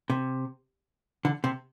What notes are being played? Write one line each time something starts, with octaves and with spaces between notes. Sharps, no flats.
C3
D3
C3